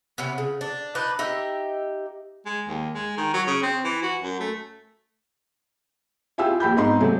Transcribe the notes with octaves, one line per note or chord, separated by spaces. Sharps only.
C3 B3 C#4
C#3
D4
D4 D#4 B4
D#4 G4 E5
G#3
D#2
G#3
D#3
F#3
C#3
C4
E3
F#4
F#2
A3
E4 F4 G4 G#4 E6
A#1 G4 B5 G6
G#2 B3 C4 D#4 C6
C3 F#3 A3 C4 G#4